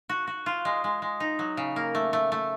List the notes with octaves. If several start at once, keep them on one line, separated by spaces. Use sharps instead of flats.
F#4
F#4
F4
G#3
G#3
G#3
D#4
F#3
C#3
A#3
A3
A3
A3